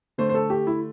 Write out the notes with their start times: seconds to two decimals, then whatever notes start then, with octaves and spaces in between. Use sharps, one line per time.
0.18 D3 A3 C5
0.29 C5
0.34 A4
0.50 G4
0.67 E4